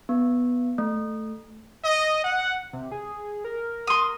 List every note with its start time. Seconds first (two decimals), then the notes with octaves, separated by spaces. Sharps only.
0.09 B3
0.78 A3
1.85 D#5
2.24 F#5
2.73 C3
2.91 G#4
3.44 A#4
3.87 C6 D#6